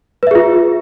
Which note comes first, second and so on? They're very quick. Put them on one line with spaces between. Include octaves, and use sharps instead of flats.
B4 E5 G#4 F4